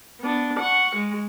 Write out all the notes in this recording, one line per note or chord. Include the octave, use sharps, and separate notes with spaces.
B3 D4
F#5 C#6
G#3